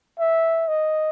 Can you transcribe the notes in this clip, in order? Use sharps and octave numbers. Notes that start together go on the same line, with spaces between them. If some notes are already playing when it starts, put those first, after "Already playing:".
E5
D#5